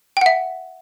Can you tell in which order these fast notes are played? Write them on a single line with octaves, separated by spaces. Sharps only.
G5 F#5 E5